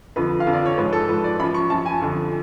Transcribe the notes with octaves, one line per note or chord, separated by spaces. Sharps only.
F2 D3 F3 B4
F5
F2 D3 F3
D5
C#5
G#2 F3 B4
A4
G#2 F3 B4
D5
F#2 F3 B5
C#6
F#2 F3 A5
G#5
F2 D3 F3